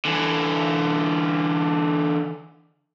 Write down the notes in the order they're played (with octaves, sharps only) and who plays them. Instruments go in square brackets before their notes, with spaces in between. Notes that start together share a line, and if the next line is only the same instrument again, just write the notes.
[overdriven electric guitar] D3 E3